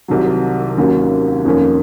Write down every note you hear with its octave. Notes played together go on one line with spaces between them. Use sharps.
C2 C3 D#3 F#3
D#2 D#3 F#3 A#3 C#4
F2 D#3 A#3 C#4